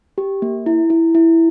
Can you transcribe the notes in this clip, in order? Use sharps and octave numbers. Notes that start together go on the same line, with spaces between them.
G4
A#3
E4
E4
E4